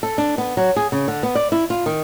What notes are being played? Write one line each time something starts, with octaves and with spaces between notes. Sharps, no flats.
A4
D4
B3
F#3
G#4
C#3
D3
B3
D5
E4
F4
D#3